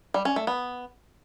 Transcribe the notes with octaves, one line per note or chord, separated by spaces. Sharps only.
G3
C#4
A3
B3